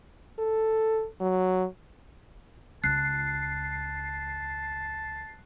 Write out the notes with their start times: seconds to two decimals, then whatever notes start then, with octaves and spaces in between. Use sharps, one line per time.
0.39 A4
1.21 F#3
2.84 C#2 F4 A5 F#6 C7